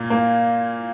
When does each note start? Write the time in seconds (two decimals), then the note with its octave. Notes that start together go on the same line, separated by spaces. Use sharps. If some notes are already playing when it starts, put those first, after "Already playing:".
Already playing: A#2 A#3
0.10 A#3